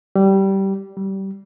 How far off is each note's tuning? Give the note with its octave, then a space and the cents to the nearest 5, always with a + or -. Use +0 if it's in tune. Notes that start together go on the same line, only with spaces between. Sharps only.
G3 -15
G3 -20